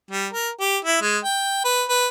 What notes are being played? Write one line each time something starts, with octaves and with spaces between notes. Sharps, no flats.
G3
A#4
G4
E4
G#3
G5
B4
B4